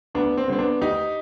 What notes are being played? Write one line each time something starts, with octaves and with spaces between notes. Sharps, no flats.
D2 B3 D4
C4
D3 G3 B3 C4
B3 D4
D2 D#4 G4